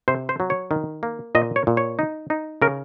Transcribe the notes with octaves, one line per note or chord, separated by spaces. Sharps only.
C3 C5
C5
F#3
C#5
D#3
A#3
A#2 D#5
C#5
A#2
C#5
D#4
D#4
C#3 A#4